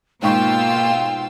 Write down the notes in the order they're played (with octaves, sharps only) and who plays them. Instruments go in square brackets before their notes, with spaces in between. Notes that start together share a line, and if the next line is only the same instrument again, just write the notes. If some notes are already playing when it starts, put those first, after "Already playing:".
[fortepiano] G#2 D#4 C#6 [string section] B2 F4 E6 [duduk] A#3 [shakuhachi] G5